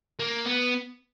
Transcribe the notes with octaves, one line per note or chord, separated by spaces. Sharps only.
A#3
B3